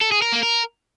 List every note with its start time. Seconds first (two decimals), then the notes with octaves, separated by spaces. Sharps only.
0.01 A4
0.12 G#4
0.22 A#4
0.32 A#3
0.43 A#4